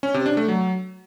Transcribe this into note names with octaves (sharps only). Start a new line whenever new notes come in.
C#4
C3
D4
A3
F#3